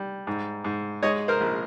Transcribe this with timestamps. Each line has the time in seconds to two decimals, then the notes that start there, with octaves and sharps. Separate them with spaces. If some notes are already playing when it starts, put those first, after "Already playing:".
Already playing: G3
0.27 G#2
0.64 G#2
1.03 G#3 C#5 D#5
1.28 A#4 C5
1.41 A#1